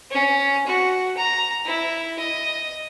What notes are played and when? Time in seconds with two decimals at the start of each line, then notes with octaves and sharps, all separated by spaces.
0.11 C#4
0.66 F#4
1.17 A#5
1.65 E4
2.18 D#5